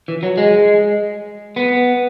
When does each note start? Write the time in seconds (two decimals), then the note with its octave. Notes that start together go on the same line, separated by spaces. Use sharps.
0.08 E3
0.23 F#3
0.38 G#3
1.56 B3